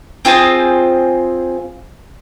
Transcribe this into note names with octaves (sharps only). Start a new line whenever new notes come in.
C4 F4 G#4 C5